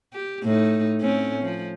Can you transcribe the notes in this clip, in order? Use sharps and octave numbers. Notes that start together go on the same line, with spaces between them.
G4
A2 A3 D#4
A2 C4 C#4
F3